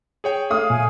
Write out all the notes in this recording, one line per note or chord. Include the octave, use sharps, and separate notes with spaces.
G#4 C#5 G5
A3 F5 D#6
A#2 G#5